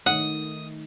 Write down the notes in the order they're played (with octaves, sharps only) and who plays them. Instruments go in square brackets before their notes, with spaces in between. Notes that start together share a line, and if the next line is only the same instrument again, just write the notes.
[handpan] D#3 A3 D#4 [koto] F#5 [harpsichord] D#6